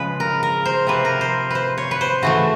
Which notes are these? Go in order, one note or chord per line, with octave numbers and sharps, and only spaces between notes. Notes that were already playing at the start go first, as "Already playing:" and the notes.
Already playing: C#3 F3 G#3 B4
A#4
A#4
C5
C3 F3 A#3 B4
A#4
C5
B4 C5
C#5
B4
C5
C#3 E3 A3 F#4